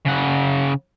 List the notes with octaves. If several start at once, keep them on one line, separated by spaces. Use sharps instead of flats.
C#3 F#5